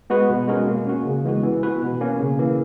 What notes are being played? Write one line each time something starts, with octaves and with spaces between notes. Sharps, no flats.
G#3 B3 F#4 B4
B2
G#3 C#4 F#4 A#4
A#3
C#4 F#4
C#3
E3 G#3 B3 F#4
E3
B3 F#4 B4
B2
A#3 C#4
C#3
E3 A#3